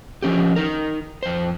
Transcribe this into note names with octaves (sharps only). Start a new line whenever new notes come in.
F3 C#4 G4
D#4 A#4
F2 C5